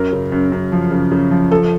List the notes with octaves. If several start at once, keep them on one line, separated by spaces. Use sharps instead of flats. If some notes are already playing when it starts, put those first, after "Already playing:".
Already playing: F#2 A#4
C#3
F#2
F#2
F3
C#3
C#3
F3
F3 A4